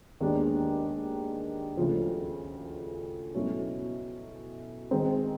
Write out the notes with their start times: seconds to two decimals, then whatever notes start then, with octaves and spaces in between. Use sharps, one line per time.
0.20 D#2 D#3 G#3 B3 D4
1.77 D2 C#3 F3
3.35 B2 F#3 A3 C#4 E4
4.91 D#3 G#3 C4